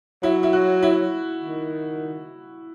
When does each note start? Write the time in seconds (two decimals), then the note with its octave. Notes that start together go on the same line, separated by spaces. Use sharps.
0.23 F#3 E4
0.43 E4
0.53 F#4
0.82 E4
1.42 D#3